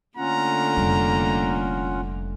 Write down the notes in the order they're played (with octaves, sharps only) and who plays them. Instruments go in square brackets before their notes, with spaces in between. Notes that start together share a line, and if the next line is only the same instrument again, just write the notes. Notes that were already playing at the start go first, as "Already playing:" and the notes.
[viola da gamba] D3 A3 A#3 [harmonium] C#4 F4 F#5 [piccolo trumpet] A#5
[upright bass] F1 G3